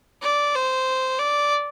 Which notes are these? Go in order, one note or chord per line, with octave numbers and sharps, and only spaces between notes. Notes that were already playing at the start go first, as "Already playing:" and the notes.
D5
C5
D5